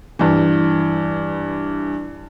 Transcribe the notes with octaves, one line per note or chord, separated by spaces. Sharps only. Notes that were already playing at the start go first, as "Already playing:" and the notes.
G2 E3